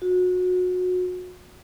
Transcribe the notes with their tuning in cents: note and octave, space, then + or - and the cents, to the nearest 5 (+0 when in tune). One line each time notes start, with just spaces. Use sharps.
F#4 -25